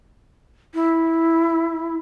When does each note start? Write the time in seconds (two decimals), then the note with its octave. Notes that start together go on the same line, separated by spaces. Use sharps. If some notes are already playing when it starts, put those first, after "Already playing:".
0.74 E4